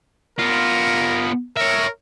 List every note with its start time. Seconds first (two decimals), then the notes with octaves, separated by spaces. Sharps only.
0.38 B3 F4 A#4
1.57 A#4 C#5 E5